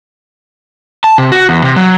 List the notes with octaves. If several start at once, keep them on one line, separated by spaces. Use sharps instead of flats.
A5
C3
F#4
E2
C3
F#3